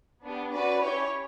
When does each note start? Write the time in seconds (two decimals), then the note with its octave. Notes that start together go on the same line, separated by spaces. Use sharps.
0.23 B3 D4 G4
0.52 C#4 F#4 B4 D5
0.83 C#4 E4 G4 C#5